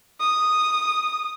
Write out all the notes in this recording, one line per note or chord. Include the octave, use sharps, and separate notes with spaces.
D#6